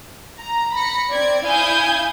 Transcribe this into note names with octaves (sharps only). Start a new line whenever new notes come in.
A#5
B5 A#6 C#7
C4 D5 G#6
E4 F5 G#5 D#6 G6 G#6